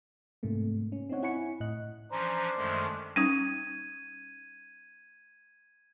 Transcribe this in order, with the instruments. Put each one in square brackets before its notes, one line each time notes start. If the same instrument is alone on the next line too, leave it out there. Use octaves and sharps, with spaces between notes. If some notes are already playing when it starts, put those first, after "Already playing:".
[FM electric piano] G#2 C3 A3 A#3
C#4
C4 D4 D#4 C#5 F#5
E4 F#5 G#5 B5 C#6 C#7
A2 D#5 F#6
[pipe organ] E3 F3 C#4 [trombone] D4 [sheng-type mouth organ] C5 [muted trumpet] A#5
[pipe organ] F#2 D#3 G#3 [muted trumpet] A3
[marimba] G3 C#4 D#4 [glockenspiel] G#6 D#7